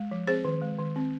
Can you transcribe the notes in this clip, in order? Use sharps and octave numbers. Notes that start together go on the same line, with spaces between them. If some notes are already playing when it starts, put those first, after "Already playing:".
Already playing: G#3
F3
C4 G#4 C5
D#3
G#3
D#3
C4